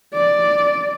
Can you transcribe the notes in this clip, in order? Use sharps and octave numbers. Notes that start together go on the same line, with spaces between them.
D5